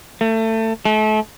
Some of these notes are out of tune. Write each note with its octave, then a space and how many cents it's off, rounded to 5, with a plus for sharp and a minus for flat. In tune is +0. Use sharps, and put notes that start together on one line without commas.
A3 +25
A3 -35